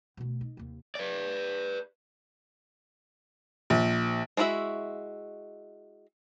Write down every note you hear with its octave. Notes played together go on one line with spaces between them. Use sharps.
D2 B2
D#4
D#2 C3
B4 D5
A#1
G#3 D4 E4 F#4 E5